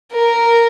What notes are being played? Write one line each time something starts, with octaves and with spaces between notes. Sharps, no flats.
A#4